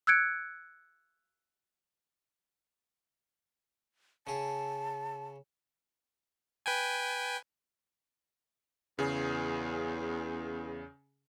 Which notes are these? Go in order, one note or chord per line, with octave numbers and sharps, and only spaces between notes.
E6 F#6 G#6 C#7 D7
C#3 G#4 A5
B4 G5 G#5
E2 C#3 G#4